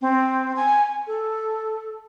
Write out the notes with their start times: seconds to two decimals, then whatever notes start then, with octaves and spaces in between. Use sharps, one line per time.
0.01 C4
0.56 G#5
1.07 A4